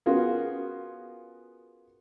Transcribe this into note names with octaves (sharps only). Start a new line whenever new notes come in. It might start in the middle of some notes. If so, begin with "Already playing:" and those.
B3 C#4 F4 F#4 G#4 A#4